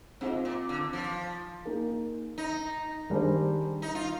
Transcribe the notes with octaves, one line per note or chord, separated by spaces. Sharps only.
G#2 C4 F4 C5
A#2
D3
F3
A#3 D#4 G#4
D#4
D#3 G3 D4 G#4 C5
D#4
F4